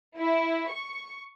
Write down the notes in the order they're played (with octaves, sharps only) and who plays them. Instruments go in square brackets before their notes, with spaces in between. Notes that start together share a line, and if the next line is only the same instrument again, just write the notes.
[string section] E4
C#6